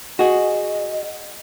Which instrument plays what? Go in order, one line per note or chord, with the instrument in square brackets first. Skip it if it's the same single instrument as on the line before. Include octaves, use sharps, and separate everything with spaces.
[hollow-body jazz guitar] F#4 G#4 [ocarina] D#5